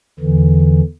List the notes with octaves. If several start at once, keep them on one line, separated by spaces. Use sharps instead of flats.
E2 D3 E3